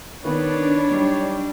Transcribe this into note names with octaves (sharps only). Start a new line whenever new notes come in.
D#3 B3 D4 B4 C#5
F#3 G3 D#4